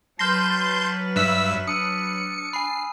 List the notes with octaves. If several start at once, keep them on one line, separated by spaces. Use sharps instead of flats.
F#3 B4 A5 C6 F6 G6 A#6
A6
G2 E5 E6 F#6 B6
D4 D#6 E6 C#7 D#7
G#5 B5 C7